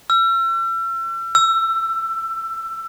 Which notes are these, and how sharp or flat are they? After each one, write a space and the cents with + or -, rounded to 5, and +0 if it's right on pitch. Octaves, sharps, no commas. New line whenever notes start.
E6 +40
E6 +20